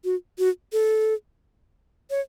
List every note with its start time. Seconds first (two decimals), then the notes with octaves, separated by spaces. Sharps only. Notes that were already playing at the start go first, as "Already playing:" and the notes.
0.05 F#4
0.39 F#4
0.73 A4
2.10 C#5